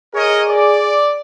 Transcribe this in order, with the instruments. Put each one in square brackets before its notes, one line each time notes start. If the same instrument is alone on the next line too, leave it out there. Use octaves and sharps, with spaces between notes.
[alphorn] G#4 [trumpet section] A#4 C#5 D#5
[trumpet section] D5